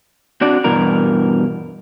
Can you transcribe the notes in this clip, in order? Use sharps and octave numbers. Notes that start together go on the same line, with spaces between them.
C4 D4 F#4 D5
G2 B2 E3 A#4